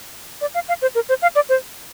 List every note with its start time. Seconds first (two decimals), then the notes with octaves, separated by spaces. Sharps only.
0.41 D5
0.54 F5
0.68 F5
0.82 C5
0.95 A#4
1.09 C5
1.22 F5
1.36 D5
1.49 C5